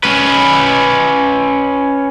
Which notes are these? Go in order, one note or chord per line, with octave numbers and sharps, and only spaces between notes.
C#4 B4